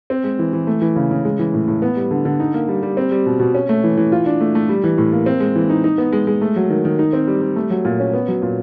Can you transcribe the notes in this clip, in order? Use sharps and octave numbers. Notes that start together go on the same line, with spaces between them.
C4
G#3
E3
E3
A3
E3
C#3
C#3
G#3
E3
A2
A2
B3
G3
D3
D3
D#4
A#3
G3
G3
C4
G3
B2
B2
C#4
A3
E3
E3
F4
D4
A3
A3
G3
E3
A2
A#3
C4
G#3
E3
D#4
D#4
B3
G#3
G#3
A3
F#3
D#3
D#3
D#4
C4
G3
G3
A3
F#3
A#2
C#4
B3
F#3
A#2